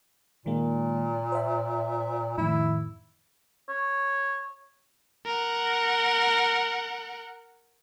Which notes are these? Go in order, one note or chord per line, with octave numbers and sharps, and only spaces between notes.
A#2 D#3 G#3 A#3
C5 E5
F2 A2 D#3 E4
C#5
A#4 F#5